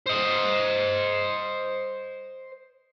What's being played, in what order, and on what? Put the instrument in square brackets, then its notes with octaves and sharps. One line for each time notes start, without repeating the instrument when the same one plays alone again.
[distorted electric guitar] C5 D#5